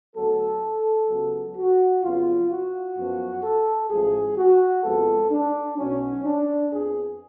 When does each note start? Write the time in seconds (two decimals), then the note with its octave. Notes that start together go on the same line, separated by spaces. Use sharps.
0.16 D2 D3 F#3 B3 A4
1.09 C#2 C#3 F#3 B3
1.56 F#4
2.03 F2 C#3 F#3 B3 F4
2.50 F#4
2.97 F#2 F3 B3
3.43 A4
3.90 A1 A2 F3 G#3 G#4
4.37 F#4
4.83 F2 C#3 F3 G#3 B3 A4
5.31 D4
5.78 B1 B2 F#3 C#4
6.24 D4
6.71 F2 F3 B3 G#4